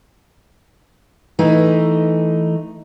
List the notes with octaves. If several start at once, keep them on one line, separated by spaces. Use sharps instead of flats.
E3 A3 D#4